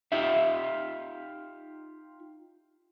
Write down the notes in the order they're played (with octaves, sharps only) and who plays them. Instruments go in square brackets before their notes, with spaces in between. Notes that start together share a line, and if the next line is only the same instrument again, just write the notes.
[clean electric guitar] D#4 F4 G4 E5